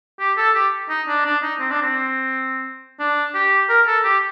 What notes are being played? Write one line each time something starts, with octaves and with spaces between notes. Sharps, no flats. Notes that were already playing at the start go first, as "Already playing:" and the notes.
G4
A4
G4
D#4
D4
D4
D#4
C4
D4
C4
D4
G4
A#4
A4
G4